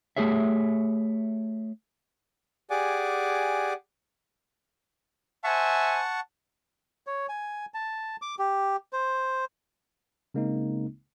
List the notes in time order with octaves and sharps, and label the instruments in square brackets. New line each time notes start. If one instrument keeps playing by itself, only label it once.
[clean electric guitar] A3 G4 G#4 C#5 E5
[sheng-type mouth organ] G4 G#4 D5 F#5 G#5 D6
[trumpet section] C5 E5 G#5 [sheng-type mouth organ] F#5 A5 C#6
[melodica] C#5
G#5
A5
D6
G4
C5
[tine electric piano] C#3 G#3 A#3 C4 D#4